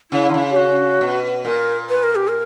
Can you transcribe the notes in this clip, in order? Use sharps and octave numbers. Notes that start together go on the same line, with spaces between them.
C#3 E4
D3
C#3
G4
F#4
B2
A#2 A#4
B4
A#4
G4
A#4